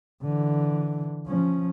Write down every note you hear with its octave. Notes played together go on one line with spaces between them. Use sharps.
D3 E3
F3 C#4